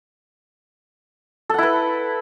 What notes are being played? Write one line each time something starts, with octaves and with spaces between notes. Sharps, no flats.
E4 A4 B4 F#5